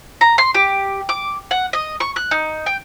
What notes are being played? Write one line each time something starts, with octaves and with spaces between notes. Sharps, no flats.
A#5
C6
G4
D6
F#5
D#5
C#6
F#6
D#4
G5